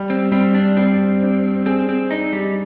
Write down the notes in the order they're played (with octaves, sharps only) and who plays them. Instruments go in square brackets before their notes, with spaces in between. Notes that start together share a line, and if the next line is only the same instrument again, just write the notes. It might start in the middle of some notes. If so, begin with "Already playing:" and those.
Already playing: [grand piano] G3
[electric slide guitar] C4
[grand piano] G3 [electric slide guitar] C4
[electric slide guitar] D4
[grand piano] G3 [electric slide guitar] C4
[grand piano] D4
[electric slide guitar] C4 [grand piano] G#4
[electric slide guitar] C4
[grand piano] D4 [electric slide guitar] D#4
[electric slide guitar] G3